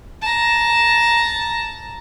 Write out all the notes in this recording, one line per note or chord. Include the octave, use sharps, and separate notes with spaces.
A5 A#5